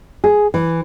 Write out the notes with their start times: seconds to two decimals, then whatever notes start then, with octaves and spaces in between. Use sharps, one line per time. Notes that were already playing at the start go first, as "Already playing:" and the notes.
0.24 G#4
0.54 E3